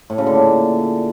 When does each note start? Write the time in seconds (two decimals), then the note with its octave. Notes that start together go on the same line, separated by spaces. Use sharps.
0.10 A2
0.18 C#3
0.27 D3
0.35 A#2